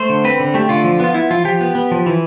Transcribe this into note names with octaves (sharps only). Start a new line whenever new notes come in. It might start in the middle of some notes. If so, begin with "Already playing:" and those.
Already playing: A3 C5
D3
C4 B4
D3
A3 G4
D3 F4
F3
B3 F4
B3 E4
F3 F4
F3 G4
B3
B3
F3
E3